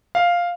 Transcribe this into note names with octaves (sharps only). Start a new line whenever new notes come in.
F5